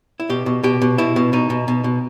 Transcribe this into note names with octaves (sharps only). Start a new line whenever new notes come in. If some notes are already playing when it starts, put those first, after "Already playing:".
E4
B2 G4
B2
B2 G4
B2
B2 E4
B2
B2 D#4
B2
B2
B2